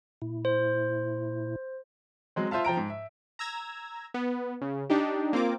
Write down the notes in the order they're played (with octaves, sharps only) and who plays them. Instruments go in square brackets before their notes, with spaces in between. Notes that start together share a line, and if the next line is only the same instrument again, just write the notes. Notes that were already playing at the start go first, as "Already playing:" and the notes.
[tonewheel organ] A#2 E4
[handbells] C5
[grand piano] F#3 G#3 C4
F4 C5 E5 F5 A5
F3 G5 A#5 D7
G#2
E5
[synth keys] A#5 E6 G#6 A#6
B3
C#3
D4 D#4 G4
A#3 C4 F4 D6